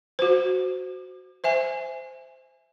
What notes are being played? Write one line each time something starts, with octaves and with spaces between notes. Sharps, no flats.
F#4 C5
C5 E5 G#5